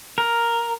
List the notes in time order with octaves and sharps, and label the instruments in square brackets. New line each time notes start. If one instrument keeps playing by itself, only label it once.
[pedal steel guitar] A#4